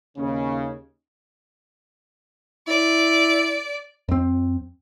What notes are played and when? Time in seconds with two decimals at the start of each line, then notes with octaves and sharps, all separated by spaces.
0.17 D#2 C#3 C#4
2.68 E4 D5
4.09 F2 C4